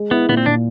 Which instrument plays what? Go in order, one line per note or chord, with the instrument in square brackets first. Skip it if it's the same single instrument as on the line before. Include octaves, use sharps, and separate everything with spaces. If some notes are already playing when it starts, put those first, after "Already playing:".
Already playing: [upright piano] G#3
[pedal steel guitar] B3 [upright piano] E4
[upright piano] A#2 [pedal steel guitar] B3
[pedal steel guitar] C4
[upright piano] A#2 [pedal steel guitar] D4